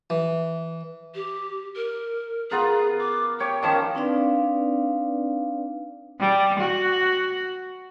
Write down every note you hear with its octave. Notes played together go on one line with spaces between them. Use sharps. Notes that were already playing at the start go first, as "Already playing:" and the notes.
E3
G4
A#4
B3 F4 G#4 A#4
D6
G4 C#5 G5
D#3 F3 C#4 A5
C4 D4 D#4 B4 D5 F5
G3
F#4